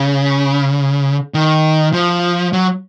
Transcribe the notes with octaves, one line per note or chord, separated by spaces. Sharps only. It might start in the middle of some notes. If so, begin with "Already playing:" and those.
Already playing: C#3
D#3
F3
F#3